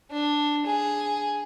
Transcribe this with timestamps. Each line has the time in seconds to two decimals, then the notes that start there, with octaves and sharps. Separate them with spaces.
0.11 D4
0.66 G#4